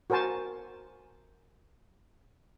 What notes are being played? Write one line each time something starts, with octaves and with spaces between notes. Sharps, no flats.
F#4 A#4 C5 G#5 A5